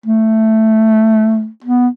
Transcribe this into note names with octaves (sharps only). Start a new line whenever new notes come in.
A3
B3